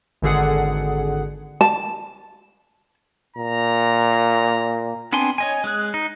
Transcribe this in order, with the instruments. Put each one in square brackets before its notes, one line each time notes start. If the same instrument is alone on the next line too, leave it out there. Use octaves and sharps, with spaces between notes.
[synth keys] G#1 D3 G#4 F#5
[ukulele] A5
[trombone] A#2 [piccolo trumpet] A#5
[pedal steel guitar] B3 C4 D4 G#5 C6
C#5 D#5 G#5
G#3 G#4 F#6
D#4